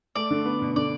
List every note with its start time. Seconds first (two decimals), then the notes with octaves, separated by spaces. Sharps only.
0.16 A3 D5
0.30 D3
0.45 B3
0.62 B2
0.76 D3 D5